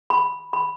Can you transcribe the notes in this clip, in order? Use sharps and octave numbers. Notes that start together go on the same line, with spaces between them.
B5
B5